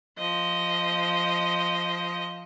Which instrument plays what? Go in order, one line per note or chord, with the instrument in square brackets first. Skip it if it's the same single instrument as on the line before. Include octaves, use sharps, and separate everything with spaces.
[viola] F3 D#5